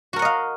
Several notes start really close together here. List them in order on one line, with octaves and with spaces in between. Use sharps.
F#4 A#4 F#5 D#5 F5